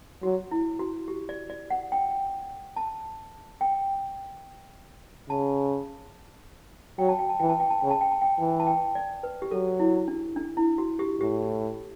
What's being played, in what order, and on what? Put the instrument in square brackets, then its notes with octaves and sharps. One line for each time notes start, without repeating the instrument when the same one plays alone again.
[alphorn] F#3 [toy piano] F#4
[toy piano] E4
F#4
G4
D5
D5
F#5
G5
A5
G5
[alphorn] C#3 [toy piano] A5
[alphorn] F#3 [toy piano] G5
[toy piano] A5
G5
A5
[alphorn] E3 [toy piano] G5
[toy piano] A5
G5
A5
[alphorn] C#3 [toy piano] G5
[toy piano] A5
G5
A5
G5
[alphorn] E3
[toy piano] A5
G5
D5
B4
G4
[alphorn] F#3 [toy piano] A4
[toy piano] E4
D4
D4
E4
F#4
G4
[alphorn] A2 [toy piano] G4